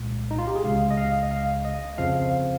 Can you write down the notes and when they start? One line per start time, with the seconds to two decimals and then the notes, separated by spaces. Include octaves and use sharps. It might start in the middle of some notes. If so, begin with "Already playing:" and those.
Already playing: C2 A#2 G#3
0.31 D#4
0.38 F4
0.47 G4
0.55 G#4
0.64 C#2 C#3 G#3 F5
0.90 D#5
0.97 F5
1.23 D#5
1.31 F5
1.65 D#5
1.98 F2 C#3 F3 F5
2.16 F5